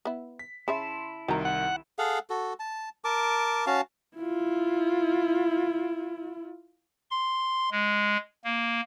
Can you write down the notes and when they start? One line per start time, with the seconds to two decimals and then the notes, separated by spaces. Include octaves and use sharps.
0.05 B3 E4
0.39 B6
0.68 C#3 E4 C#5 E5 A5 B5 C6
1.28 C2 D#3 F#4 A#5
1.45 F#5
1.98 G#4 A4 F5 F#5
2.30 F#4 A4
2.59 A5
3.04 A#4 A5 D6
3.66 C#4 F#4 F5 A5
4.17 E4 F4
7.11 C6
7.71 G#3
8.44 A#3